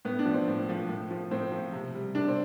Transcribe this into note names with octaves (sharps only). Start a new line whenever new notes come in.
A2 B3
D4
F3
C4
A2
F3
A2
F3
A2 C4
F3
C3
G3
C3 D4
C4